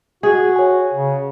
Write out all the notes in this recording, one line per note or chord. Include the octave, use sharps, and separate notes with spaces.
F#4 G#4
C#5 G#5
C#3